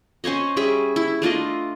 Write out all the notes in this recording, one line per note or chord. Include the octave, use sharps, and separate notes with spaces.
C#4 C5 C#5 D#5
G3 C#4 G#4 E5
E4
A3 D4 F4 D#5